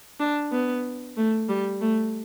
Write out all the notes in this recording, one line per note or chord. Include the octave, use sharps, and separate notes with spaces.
D4
B3
A3
G3
A3